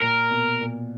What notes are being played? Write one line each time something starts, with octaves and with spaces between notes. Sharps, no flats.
A#2 A#4
B2
A#2